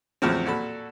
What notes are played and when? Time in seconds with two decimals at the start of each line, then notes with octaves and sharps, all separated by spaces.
0.22 E2 A2 C#3 F3 F#3 C4
0.45 A#2 F#4 A4 B5